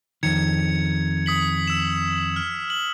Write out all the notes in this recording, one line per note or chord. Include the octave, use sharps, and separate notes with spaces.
F2 D#3 G#6 C#7 F7
D#6 B6 F#7
E6 E7
F6
F#7